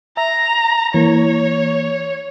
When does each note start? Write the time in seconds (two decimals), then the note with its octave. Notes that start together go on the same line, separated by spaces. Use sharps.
0.17 E5 A#5
0.94 E3 A#3 C#5